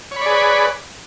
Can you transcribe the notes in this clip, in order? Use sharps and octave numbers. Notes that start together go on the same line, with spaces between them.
G#4 B4 C#5 D5 B5